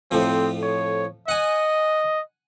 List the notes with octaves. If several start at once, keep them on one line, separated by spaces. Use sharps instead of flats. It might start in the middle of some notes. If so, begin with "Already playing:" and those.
F2 A2 F3 C4
C#5
D#5 F#5 G#5